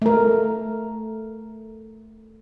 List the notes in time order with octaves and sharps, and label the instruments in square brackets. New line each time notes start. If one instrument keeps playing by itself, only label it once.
[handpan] A3 A#4